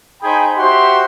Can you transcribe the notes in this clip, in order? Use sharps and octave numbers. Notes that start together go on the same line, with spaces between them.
D#4 G#4 C5 G5 G#5 B5
F#4 G4 C5 E5 F#5 C6